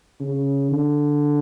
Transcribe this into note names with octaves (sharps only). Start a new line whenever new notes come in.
C#3
D3